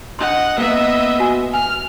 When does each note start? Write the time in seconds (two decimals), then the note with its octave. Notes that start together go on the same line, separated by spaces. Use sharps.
0.19 D4 D#5 F#5 C6
0.58 A#3 B3 D#5 E5
1.20 F#4 G#5
1.54 G#5 F6